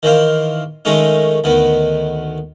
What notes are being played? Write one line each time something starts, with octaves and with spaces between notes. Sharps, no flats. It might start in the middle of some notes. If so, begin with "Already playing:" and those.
D#3 E3 C5 F5
D#3 G#3 A3 C#4 D#4
D2 D#3 B3